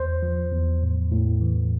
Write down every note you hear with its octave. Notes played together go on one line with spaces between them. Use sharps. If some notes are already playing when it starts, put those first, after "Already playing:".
Already playing: E2 C5
F3
E2
A2
A2
E3